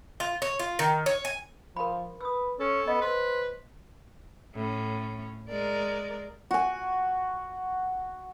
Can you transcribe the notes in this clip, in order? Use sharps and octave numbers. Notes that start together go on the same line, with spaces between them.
F4
C#5
F4
D#3
C#5
G#5
F3 A#4 B5
B4 D#6 E6
C#4 A4
B3 D#5
B4 C5
A2 C#4
G#3 A#4 D5
F#4 G#5